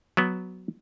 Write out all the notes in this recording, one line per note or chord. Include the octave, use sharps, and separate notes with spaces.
F#3 B3